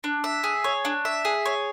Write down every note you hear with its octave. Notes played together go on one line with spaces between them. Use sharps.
D4
E5
G#4
C#5
D4
E5
G#4
C#5